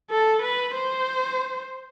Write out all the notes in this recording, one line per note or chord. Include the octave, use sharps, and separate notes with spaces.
A4
B4
C5